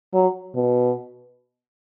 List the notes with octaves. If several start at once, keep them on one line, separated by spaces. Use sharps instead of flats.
F#3
B2